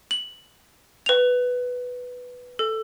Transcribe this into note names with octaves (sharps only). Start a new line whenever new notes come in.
F#7
B4 F7
A4